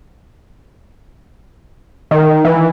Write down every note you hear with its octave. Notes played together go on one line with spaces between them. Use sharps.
D#3
E3